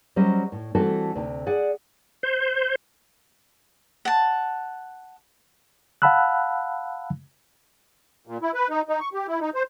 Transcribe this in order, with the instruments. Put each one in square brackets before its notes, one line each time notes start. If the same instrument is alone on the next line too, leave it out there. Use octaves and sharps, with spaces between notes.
[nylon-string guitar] F#3 G3 C#4 C5 D#5
A2
E3 G3 A3 C4 F#4 A4
D2 C3
G#4 D5 F#5
[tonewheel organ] C5
[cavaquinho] F#5 A5
[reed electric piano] F5 F#5 A5 B5 E6 F#6
[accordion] A#2
E4
B4
D#4
D#4
C#6
G4
E4
D#4
C5